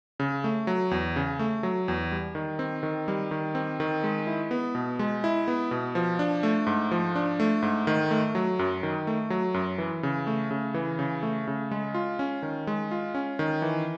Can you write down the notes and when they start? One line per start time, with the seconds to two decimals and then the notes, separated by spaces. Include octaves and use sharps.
0.20 C#3
0.44 A3
0.67 F#3
0.91 E2
1.16 C#3
1.39 A3
1.63 F#3
1.88 E2
2.12 G3
2.35 D#3
2.59 C4
2.83 D#3
3.08 G3
3.31 D#3
3.55 C4
3.80 D#3
4.04 G#3
4.27 E4
4.51 B3
4.75 B2
4.99 G#3
5.24 E4
5.48 B3
5.71 B2
5.95 F3
6.19 D4
6.43 A3
6.67 G#2
6.91 F3
7.15 D4
7.40 A3
7.62 G#2
7.87 D#3
8.11 A3
8.35 F#3
8.59 F#2
8.83 D#3
9.07 A3
9.30 F#3
9.54 F#2
9.78 E3
10.03 C#3
10.27 A3
10.51 C#3
10.74 E3
10.99 C#3
11.23 A3
11.47 C#3
11.71 G#3
11.94 F4
12.19 C#4
12.42 D#3
12.67 G#3
12.91 F4
13.15 C#4
13.39 D#3
13.62 E3